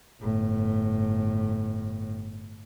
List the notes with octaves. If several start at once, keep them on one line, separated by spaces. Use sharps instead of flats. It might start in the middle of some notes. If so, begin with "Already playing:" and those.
G1 A2